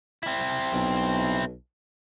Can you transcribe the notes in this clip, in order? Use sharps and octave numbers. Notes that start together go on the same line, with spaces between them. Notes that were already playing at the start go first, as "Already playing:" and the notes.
C4 E4
B1